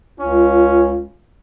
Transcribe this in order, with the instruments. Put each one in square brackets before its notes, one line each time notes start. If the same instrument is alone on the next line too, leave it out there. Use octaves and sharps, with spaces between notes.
[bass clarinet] C#2 [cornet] C#4 [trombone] F4